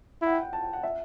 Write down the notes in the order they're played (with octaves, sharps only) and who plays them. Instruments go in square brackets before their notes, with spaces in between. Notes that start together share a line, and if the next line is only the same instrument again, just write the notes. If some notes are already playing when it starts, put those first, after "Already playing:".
[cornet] E4
[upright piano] F#5
G5
G5
A5
G5
F#5
E5